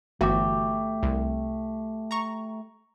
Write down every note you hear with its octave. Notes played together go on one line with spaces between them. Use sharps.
G1 E3 A3 F#4 G4
C2
A#5 C#6